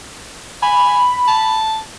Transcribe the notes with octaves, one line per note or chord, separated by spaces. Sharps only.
G#5 B5
A5